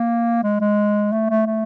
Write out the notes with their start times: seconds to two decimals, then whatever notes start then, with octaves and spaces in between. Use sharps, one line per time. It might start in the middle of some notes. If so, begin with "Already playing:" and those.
Already playing: A#3
0.43 G#3
0.60 G#3
1.13 A3
1.30 A3
1.46 A3